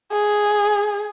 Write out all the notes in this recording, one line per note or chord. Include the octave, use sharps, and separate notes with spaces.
G#4